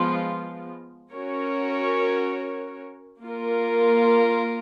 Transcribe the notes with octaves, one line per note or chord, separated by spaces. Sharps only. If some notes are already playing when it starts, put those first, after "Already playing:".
Already playing: F3 G#3 B3 F4
C#4 F#4 A#4 C#5
A#3 F4 A#4